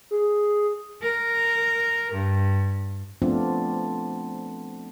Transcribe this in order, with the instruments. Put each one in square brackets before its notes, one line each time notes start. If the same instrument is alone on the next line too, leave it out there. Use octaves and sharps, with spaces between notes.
[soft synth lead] G#4
[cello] A#4
G2
[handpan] F3 A3 B3 C4 D4 F4